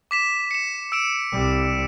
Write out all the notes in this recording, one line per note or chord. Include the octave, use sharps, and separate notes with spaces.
D6 B6 E7
C#7 E7
E6 D7 E7
C2 G3